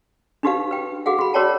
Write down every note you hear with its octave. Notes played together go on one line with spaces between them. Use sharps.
D4 D#4 F#4 G4 B4 F5
B4 G5
F#4 G#4 F5 F#5
F#4 B5
F#4 A#4 C#5 D5 G5 A5